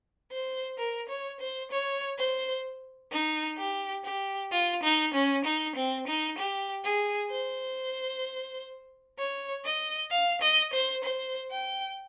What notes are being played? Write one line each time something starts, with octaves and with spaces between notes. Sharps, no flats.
C5
A#4
C#5
C5
C#5
C5
D#4
G4
G4
F4
D#4
C#4
D#4
C4
D#4
G4
G#4
C5
C#5
D#5
F5
D#5
C5
C5
G5